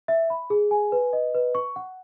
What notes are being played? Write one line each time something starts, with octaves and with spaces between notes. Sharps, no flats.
E5
B5
G#4
G#5
B4
D#5
B4
C#6
F#5